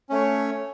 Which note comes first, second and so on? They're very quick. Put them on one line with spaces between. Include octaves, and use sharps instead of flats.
C#4 A3 C#5